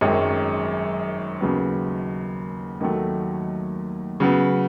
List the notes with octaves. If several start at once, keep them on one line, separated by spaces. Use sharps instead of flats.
G#1 F#2 D#3 G#3 C#4
D#2 C#3 F#3 B3
D#2 D#3 F#3 A3
C#3 F#3 B3